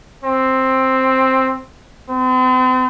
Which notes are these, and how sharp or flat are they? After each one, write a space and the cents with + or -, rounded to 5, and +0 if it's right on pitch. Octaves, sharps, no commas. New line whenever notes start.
C4 +5
C4 -40